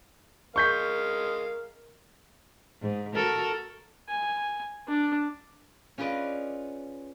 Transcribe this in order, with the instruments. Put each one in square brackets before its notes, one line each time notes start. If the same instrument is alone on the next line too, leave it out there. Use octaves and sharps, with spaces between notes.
[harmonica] G#3 F5 [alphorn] A#4 [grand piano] C#6 G6 B6
[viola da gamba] G#2
F#4 A4 A#4
[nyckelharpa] G#5
D4
[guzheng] C#4 F4 G#4 B4 D5 D#5